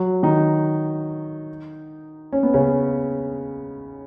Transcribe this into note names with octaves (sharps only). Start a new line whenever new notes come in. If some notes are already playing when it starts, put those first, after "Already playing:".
Already playing: F#3 F#4
D#3 D#4
C#4
B3
C#3 C#4